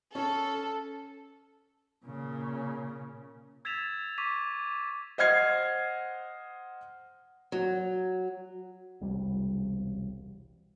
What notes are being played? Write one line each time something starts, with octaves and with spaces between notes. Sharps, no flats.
C#4 A4
A#2 C#3
E6 G#6 A6 B6 E7 F7
C#6 D6 B6 D#7 F7
C5 D#5 F#5 F6 G#6 C7
F#3
E1 C2 G3